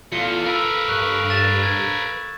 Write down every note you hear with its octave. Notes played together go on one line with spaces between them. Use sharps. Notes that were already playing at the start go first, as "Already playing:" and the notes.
E2 F4 A4 F5 C#7 G7
A#4 B4 B5 E6
G2 C#6 F#6
A6 E7 F7
G#6